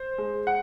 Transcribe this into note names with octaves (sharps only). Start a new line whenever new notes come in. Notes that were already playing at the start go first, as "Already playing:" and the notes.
Already playing: C5
G#3
F#5